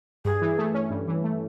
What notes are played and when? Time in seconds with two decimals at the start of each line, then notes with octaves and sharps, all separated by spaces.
0.25 G2 G#4
0.42 E3
0.58 A3
0.74 C#4
0.90 G2
1.08 E3
1.24 A3